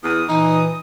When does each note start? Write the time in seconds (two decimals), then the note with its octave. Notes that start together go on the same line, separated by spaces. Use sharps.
0.03 E2 D#6
0.28 A#2 E3 D#4